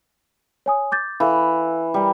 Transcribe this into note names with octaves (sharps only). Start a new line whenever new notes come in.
C#5 G#5 D#6
D6 G6 A6
E3 A4 F5
G3 A#4